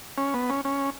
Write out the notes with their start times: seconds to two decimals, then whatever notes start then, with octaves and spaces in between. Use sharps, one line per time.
0.18 C#4
0.34 B3
0.50 C#4
0.65 C#4